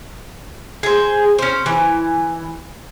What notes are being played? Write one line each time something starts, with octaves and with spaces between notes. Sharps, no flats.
G#4 C5
C#4 C5
E3